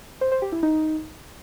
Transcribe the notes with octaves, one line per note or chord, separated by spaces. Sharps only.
C5
C5
G4
E4
D#4